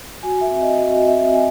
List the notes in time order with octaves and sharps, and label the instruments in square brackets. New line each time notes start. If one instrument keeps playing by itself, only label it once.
[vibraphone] F#4 G#5
E5
C4
D#5
F#4 D#5
C4 E5
F#4 G#5